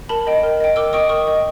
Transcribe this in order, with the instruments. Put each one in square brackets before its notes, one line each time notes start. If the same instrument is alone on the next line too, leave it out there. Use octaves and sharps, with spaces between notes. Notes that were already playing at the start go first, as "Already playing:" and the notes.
[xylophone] A#4 A5 B5
D#5 G5
A#4
D#5 G5
A#4 D6 E6
D#5 G5 C#6 D#6
A#4 C#6 D#6
D#5 G5